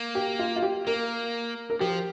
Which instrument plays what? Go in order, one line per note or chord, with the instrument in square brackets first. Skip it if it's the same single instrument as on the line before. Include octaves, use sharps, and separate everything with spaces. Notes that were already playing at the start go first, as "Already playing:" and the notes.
Already playing: [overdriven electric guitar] A#3
[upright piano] G4
F4
F4
G4
[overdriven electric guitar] A#3 [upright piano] A#4
[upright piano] A#4
[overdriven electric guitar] F3 [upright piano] G4